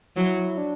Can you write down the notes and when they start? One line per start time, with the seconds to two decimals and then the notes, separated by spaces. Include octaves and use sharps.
0.16 F#3 E4
0.58 D4